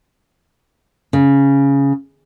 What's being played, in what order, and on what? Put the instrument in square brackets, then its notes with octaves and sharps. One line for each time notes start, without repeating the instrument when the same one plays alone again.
[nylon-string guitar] C#3